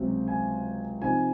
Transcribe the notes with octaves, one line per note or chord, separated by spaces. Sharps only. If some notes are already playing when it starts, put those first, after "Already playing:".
Already playing: C#2 C3 F#3 C4
G#5
C3 F3 C4 D#4 G#5